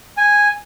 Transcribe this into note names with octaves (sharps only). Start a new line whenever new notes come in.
G#5